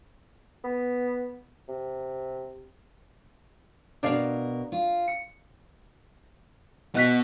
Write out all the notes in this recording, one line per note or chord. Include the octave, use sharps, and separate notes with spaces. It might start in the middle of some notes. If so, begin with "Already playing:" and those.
B3
C3
B2 D4 A#4 D5 F5
F4
C#7
B3 F#4 D#5 F#6 B6